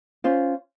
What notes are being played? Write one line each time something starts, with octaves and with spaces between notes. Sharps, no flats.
C#4 F4 C5